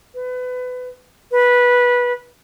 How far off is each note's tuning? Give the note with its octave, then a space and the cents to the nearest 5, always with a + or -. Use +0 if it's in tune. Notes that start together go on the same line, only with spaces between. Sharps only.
B4 +25
B4 -15